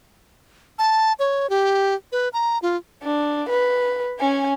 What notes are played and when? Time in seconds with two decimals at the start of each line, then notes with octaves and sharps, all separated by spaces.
0.79 A5
1.19 C#5
1.50 G4
2.12 B4
2.33 A#5
2.62 F4
3.03 D4
3.50 B4
4.20 C#4 G#5